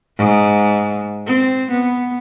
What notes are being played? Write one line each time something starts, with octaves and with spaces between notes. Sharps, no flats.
G#2
C4
B3